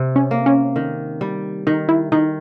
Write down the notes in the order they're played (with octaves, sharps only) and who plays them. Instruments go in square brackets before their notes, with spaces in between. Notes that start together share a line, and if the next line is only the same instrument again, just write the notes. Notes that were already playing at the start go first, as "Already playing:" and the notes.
Already playing: [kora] C3
[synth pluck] C#4
[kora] A#3
[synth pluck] C#4
[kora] D#3
G3
[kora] D#3 [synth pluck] D#4
[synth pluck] E4
[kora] D#3 [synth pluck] D#4